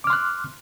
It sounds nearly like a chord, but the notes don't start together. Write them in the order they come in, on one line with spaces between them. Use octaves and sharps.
D6 F6 C6 F#6